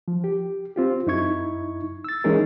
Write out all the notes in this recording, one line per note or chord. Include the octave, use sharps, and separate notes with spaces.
F3
G4
C4 F4 G4
F#2 D#4 E4 C#6 G#6
E6 A6
E3 G#3 C#4 D#4 G#4 A#4